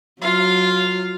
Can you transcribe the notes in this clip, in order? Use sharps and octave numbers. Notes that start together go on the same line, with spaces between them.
F#3 F4 F5